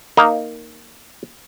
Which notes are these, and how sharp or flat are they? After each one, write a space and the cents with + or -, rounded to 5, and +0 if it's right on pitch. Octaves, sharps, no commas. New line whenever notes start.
A#3 +0 D#4 +0